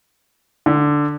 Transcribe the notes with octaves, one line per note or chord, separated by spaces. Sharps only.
D3